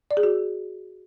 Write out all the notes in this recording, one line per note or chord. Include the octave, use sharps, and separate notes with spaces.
D5
G#4
F#4